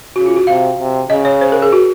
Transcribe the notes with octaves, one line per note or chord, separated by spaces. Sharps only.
C#3 F#4
F4
F#4
C3 F5
C3
C#3 D#5
C#5
C5
A#4
G#4
F#4